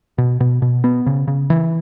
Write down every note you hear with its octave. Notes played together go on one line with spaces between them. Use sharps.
B2
B2
B2
B3
C#3
C#3
E3